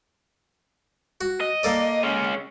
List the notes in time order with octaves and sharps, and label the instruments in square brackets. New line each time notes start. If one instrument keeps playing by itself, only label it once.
[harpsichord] F#4
[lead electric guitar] D#5
[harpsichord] A#3 A4 D5
[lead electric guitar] G#3 C#4